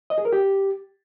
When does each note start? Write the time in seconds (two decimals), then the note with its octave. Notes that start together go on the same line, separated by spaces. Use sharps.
0.10 D#5
0.18 G#4
0.25 A#4
0.33 G4